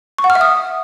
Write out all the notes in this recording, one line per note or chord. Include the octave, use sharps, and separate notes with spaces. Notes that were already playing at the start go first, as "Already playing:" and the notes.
C#6
F#5
F6
E5
D#6